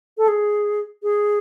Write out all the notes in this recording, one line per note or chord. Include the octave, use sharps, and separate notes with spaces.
A4
G#4
G#4